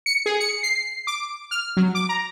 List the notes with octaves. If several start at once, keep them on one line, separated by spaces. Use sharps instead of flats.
C#7
G#4
C#7
C7
D6
F6
F#3
D6
A#5